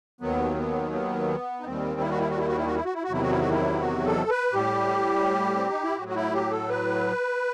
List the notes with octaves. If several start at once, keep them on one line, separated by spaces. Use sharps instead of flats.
D#2 D#3 F#3 B3
B3
B3
D#4
D#2 D#3 G3 C4
E4
F#4
E4
F#4
E4
F#4
E4
F#4
E4
F#4
E4
F#4
E2 C3 D#3 F#3 E4
F#4
E4
F#4
E4
F#4
A4
B4
A2 G3 G4
C4
D#4
E4
A2 F#3 F#4
F#4
E4
G4
A4
B4